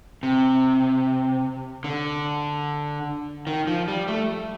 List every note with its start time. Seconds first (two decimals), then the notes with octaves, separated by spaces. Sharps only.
0.23 C3
1.84 D3
3.47 D#3
3.67 F3
3.88 G3
4.08 A3